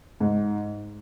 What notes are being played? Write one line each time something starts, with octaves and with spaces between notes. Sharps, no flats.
G#2